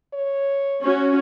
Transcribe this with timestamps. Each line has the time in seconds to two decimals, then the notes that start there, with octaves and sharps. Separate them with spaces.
0.13 C#5
0.82 C#4 F#4